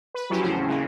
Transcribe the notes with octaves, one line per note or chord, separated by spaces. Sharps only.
B4
F3 F#3 C#4 E4 G4
E2 A2 C#3 C4 C#4 C5
C#3 E3 G#3 A#3